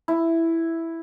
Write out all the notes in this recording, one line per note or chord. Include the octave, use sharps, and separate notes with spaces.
E4